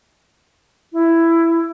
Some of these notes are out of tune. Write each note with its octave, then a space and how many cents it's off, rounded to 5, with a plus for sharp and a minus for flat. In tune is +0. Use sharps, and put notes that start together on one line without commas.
E4 +10